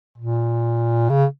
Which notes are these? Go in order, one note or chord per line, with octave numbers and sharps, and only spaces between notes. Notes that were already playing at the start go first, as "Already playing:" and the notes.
A#2
C#3